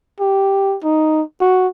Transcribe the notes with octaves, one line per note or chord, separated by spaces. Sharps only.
G4
D#4
F#4